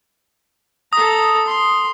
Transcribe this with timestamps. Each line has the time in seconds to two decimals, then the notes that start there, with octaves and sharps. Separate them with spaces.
0.93 A4 A#5 D#6
1.46 C6